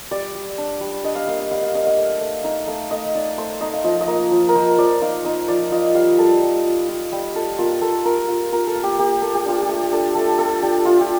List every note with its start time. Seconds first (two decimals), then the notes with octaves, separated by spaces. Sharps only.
0.11 G3 D5
0.35 G3
0.58 D4
0.81 G3
1.04 D4 D#5
1.15 F5
1.27 A#3 F5
1.39 D#5
1.51 G3 F5
1.63 F5
1.75 D4 D#5
1.87 F5
1.98 A3
2.21 A3
2.44 D#4 D#5
2.67 A3 F5
2.91 A3 D#5
3.15 D#4 D5
3.37 A3 C5
3.61 D#4 D#5
3.74 F5
3.84 F3 D#5
4.01 D#5
4.08 A#3
4.31 F3
4.49 A#4
4.55 F3 C5
4.78 F3 D5
5.01 D#4 F5
5.24 D#4 D#5
5.48 F3 D5
5.72 F4 D#5
5.94 G3 F5
6.18 G3 A4
6.42 G3
6.65 F4
6.89 F4
7.12 G3 G4
7.35 F4 A4
7.59 A#3 F4
7.82 A#3 A4
8.05 F4 A#4
8.28 F4
8.52 F4 A#4
8.67 A4
8.75 A#3
8.83 G4
8.99 A#3 G4
9.22 A#3 A4
9.35 G4
9.45 D4 F4
9.62 G4
9.69 A3
9.92 D4 A4
10.15 A3 A4
10.38 F4 A4
10.62 D4 G4
10.85 A3 F4
11.01 G4